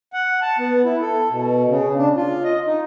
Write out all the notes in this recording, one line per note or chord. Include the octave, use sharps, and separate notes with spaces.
F#5
A5
B3
E4
A4
B2
C#3
D4
F4
D#5
D#4